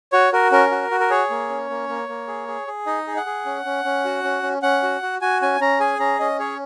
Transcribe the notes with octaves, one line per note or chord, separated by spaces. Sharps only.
F#4 C#5
F#4 A#4
C#4 A#4
F#4
F#4
A#4
G#4 C#5
A#3
C#4
A#3
A#3
A#3
G#4
G#4
G#4
D#4 D#5
G#4
F#5
G#4
C#4
C#4
C#4
F#4
C#4
C#4
C#4 F#5
F#4
F#4
F#4 G#5
C#4 G#5
C#4 A#5
G#4 G#5
C#4 A#5
C#4 D#5
G#4 C#5